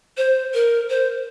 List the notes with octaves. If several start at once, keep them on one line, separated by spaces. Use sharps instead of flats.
C5
A#4
C5